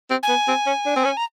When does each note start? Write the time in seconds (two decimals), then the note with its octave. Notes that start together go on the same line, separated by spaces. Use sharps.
0.10 C4
0.23 G#5
0.29 B3
0.48 C4
0.66 C#4
0.86 D4
0.96 C4
1.05 C#4
1.17 A#5